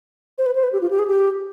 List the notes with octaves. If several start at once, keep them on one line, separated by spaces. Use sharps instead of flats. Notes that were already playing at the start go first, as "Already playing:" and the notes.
C5
B4
C5
B4
G4
F4
G4
G#4
G4